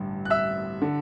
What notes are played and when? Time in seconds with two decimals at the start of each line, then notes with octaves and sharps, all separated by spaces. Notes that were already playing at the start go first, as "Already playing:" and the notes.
Already playing: A1 G2 D3
0.25 F#6
0.30 E5 E6
0.82 D3